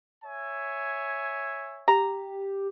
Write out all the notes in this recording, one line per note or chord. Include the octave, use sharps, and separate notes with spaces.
C#5 E5 G#5
G4 A#5